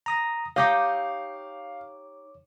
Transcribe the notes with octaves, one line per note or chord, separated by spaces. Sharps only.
A#5 D#6 A#6
D#4 G4 C#5 D#5 F5 D6